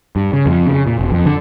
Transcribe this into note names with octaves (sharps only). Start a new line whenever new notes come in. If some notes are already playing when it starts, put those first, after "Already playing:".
G2
C#3
F2
C#3
A#2
E1
F2
D3